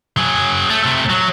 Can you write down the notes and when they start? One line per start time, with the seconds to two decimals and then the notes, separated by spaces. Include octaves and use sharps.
0.17 F#3 G#4
0.70 A3
0.83 C3 A3
1.10 F#3